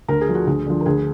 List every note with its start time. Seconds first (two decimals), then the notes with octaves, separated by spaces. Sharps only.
0.08 D2 A#4
0.21 G#4
0.28 D3 F3
0.35 F#4
0.47 D2 G#4
0.66 D3 F3
0.81 A#4
0.86 D2 G#4